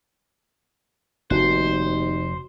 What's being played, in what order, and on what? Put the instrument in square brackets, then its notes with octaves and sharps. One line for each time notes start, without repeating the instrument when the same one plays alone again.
[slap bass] F1 [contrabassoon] D#2 [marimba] F#4 [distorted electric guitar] C5